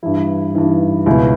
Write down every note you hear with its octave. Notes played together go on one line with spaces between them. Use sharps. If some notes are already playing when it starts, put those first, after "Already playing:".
G2 E3 E4
G2 E3 D#4
C#2 B2 E4